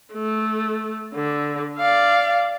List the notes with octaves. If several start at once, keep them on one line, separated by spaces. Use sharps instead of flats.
A3
D3
D5 F5